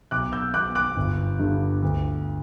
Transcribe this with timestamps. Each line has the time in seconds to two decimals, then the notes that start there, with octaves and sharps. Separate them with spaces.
0.11 B1 D6 F#6
0.32 E6 G6
0.54 B2 D6 F#6
0.75 D6 F#6
0.96 G1
1.39 G2 D3
1.82 D2